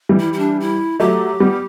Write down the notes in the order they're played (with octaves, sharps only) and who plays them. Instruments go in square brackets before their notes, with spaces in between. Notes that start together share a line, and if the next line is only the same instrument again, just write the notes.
[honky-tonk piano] E3 G3
[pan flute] E4
E4
D4
E4
[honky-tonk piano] F#3 A3 [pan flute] G4
[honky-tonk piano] G3 B3